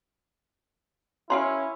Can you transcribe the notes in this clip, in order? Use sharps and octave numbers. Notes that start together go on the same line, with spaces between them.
C#4 E4 A#4 F5 A#5 C6